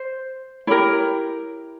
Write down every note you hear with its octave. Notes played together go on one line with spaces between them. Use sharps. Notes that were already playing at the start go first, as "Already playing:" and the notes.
Already playing: C5
E4 G4 A#4 C#5